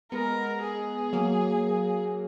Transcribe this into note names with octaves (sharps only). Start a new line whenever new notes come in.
G#3 B3 A#4
G#4
F#3 A#3